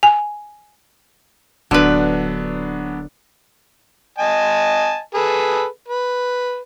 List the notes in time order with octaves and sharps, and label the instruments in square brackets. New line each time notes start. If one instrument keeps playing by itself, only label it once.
[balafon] G#5
[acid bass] D1 [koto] D3 B4 [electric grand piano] F#3 B3 D4
[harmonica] D#5 G#5 A5
G#4 A4 B4
B4